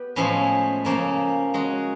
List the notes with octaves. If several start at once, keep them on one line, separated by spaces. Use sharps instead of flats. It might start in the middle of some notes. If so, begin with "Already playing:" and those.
Already playing: B3 G4
A2 F3 G#3 C#4 E4
C#3 F3 A#3 C#4
G#3 C#4 F#4